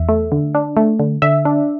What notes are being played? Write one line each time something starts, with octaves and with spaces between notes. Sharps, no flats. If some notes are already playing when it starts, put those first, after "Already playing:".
Already playing: E2 E5
A3
D3
D4
A3
D3
D3 E5
D4